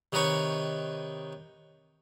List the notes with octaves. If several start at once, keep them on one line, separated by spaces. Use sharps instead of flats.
C3 D#3 D#4 B4 C#5 C#6